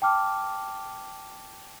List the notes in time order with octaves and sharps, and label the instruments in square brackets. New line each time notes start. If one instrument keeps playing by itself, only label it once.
[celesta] G5 A5 D6 F6